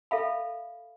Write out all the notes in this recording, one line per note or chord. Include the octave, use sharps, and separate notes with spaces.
A4 E5 F5 B5